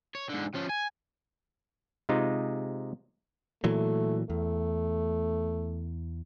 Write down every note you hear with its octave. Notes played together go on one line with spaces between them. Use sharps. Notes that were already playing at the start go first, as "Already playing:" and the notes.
C#5
G#2 D3
F3 C#4
G#5
C3 G#3 D#4 F4
A#2 E3 F#3 A3
E2 A3